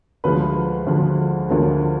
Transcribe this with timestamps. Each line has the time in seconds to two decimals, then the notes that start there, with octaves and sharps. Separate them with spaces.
0.24 D2 D3 F3 G#3 B4
0.87 D2 D3 F3 G#3
1.49 D2 D3 F3 G#3 A#4